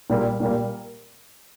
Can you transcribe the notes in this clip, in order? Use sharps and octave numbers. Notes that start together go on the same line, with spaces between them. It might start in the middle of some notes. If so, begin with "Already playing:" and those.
A#2 G3 A#3
A#2 G3 A#3